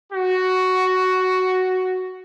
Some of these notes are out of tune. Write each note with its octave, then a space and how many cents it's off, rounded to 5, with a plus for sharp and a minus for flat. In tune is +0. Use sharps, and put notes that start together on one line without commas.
F#4 +5